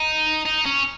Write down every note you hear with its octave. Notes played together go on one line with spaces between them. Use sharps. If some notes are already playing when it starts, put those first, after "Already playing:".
Already playing: D#4
D#4
C#4